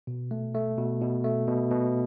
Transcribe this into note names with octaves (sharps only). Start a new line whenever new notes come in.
B2
A3
A3
B2
B2
A3
B2
B2